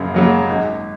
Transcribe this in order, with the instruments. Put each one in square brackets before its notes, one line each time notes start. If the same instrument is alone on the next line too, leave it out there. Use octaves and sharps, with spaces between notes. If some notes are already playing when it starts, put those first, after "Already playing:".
Already playing: [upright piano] F#2 C#3 F#3 A#3
C#3 F#3 A#3
G#1